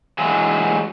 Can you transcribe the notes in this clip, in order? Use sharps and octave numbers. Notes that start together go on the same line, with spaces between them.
E3 F#3 G#3 E4